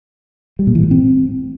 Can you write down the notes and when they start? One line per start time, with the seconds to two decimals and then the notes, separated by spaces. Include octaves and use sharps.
0.59 G3
0.67 A#2
0.75 E3
0.83 A2
0.91 C4